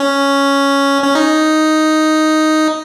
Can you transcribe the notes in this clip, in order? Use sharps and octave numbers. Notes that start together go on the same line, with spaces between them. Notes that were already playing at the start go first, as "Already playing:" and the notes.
Already playing: C#4
C#4
D#4